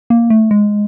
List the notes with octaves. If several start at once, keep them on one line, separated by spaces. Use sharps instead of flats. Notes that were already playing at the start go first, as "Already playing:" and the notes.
A#3
A3
G#3